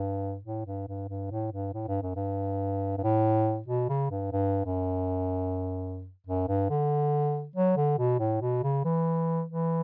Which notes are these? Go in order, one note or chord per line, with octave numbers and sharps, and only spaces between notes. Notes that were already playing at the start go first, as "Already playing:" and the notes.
Already playing: G2
A2
G2
G2
G2
A2
G2
A2
G2
F#2
G2
G2
A2
B2
C#3
G2
G2
F#2
F#2
G2
D3
F#3
D3
B2
A2
B2
C#3
E3
E3